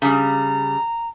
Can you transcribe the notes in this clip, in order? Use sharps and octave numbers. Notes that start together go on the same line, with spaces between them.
C#3 G3 A#5